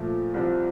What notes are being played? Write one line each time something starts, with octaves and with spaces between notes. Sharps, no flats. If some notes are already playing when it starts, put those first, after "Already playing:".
Already playing: A#2 F3 A3
C2 C3 F3 C4